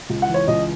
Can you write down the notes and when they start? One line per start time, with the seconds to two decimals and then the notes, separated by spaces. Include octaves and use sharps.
0.10 C#2
0.22 F#5
0.28 E3
0.34 C#5
0.47 C#2 D#5